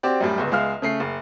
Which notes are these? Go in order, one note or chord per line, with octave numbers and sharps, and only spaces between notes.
C4 F#4 G4 C5 D5
F#2 A2 G3
G1 C#2
C#2 G#3 E5 F5 F6
C#3 A3 C7
F#1